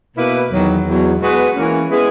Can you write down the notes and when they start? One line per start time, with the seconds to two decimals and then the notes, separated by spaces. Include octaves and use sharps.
0.16 B2 A#3 E4 B4
0.51 E2 D#3 F#3
0.85 E2 B2 F#3
1.20 G#3 B3 F#4 B4
1.55 E3 A#3 C#4
1.90 G#3 B3 E4 G#4